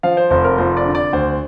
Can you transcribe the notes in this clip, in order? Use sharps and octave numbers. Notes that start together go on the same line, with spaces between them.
F3 F5
C5
F1 C5
A#4
F2 C5
D5
D3
D5
D2 C5